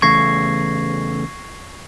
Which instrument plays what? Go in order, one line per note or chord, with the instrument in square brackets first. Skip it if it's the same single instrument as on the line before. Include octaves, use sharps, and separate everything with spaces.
[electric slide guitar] E2 C#3 A3 [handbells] C#6 [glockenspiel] G#6 A#6 C7